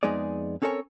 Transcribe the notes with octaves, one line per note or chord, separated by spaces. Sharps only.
F2 G#3 B3 D#4 G#4 D5
C4 C#4 A4 A#4 C#5 G#5